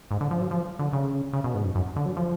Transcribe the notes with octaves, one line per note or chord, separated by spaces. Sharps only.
G#2
D3
F3
F#3
F3
D3
C#3
C#3
B2
G#2
F#2
F#2
D3
F#3
F3